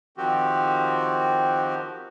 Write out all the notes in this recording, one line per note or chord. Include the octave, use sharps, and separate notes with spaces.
D#3 F3 C4 F#4 G4